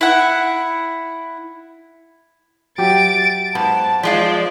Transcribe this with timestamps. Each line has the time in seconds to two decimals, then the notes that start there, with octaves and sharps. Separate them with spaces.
0.01 E4 F#5
2.78 F#3 G4 E5 A6 D7
3.55 G#2 B3 A5
4.03 F3 G#3 F4 D5